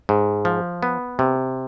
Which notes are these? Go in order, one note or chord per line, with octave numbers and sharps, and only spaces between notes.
G#2
F3
B3
C3